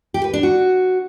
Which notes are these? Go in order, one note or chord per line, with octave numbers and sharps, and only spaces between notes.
G4
B4
D4
F#4